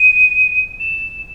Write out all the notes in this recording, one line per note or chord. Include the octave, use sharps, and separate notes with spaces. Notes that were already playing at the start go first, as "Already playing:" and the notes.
Already playing: D#7
E7